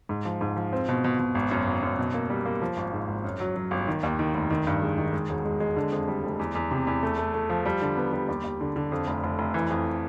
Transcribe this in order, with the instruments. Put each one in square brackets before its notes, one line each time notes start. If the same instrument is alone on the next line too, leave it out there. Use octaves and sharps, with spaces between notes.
[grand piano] G#2
F3
G#2
F3
C4
B2
B2
B2
G#1
F#2
G#1
F#2
B2
A#3
G3
A#3
F3
G#1
G#2
G#1
F#2
F#3
F#3
G1
D#3
D#2
D#3
F1
D#3
G2
G#3
D#3
G#3
E1
G#3
G#3
D3
F2
G3
F1
E2
E2
C3
E2
A3
A3
A3
F3
G3
D3
B3
G3
D#2
D#2
D3
D3
F2
F1
F1
F1
E3
F2